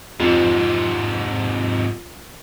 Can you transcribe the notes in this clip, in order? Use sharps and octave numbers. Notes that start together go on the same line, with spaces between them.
F2 G#2 C3